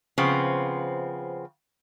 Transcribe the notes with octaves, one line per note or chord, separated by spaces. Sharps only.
C#3 F3 B3 C4